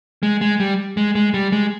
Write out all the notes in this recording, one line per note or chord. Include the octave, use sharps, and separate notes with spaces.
G#3
G#3
G3
G#3
G#3
G3
G#3